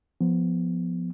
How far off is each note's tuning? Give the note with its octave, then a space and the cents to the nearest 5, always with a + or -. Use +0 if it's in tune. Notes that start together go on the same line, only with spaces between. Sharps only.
F3 +5 B3 +0